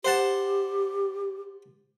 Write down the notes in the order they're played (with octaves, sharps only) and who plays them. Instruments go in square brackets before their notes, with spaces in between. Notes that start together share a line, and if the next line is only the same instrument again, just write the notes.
[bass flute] G4 [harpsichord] C5 F#5 A5